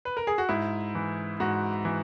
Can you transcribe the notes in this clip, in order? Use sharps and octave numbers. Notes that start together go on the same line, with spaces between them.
B4
A#4
G#4
F#4
G#2 E4
E3
G#2 F#4
E3